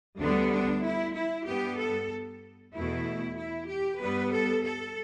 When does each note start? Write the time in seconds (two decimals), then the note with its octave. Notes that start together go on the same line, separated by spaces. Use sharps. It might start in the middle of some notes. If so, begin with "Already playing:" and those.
0.19 D2 D3 G3 B3 D4
0.52 D4
0.84 E4
1.15 E4
1.46 G2 G3 B3 G4
1.78 A4
2.74 E2 B2 A3 E4
3.37 E4
3.69 G4
4.00 G2 G3 B3 B4
4.32 A4
4.63 A4